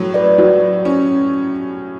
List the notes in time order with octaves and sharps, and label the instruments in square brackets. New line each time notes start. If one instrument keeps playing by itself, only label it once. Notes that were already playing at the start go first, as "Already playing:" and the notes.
Already playing: [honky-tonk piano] A2 F#3
[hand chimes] B4 D5
[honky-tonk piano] F#3 [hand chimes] F#4
[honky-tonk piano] C#4